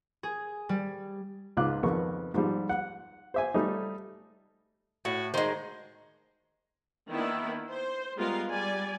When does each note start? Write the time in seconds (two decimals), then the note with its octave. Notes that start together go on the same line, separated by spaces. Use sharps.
0.23 G#4
0.69 G3
1.57 C#2 G#2 F4 D6 F#6
1.83 G#1 F2 B3 A#4 C#6
2.34 G#2 F3 G3
2.69 F#5
3.34 C5 E5 G#5
3.54 G3 A3 D#4
5.05 A2 F#4
5.34 D#3 G#3 C5
7.09 D#3 A#3 B3 D4 E4
7.70 C5
8.16 G3 G#3 B3 F4 A#4 F5
8.48 G3 D5 G#5